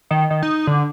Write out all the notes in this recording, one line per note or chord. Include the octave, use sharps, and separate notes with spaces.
D#3
D#3
D#4
D3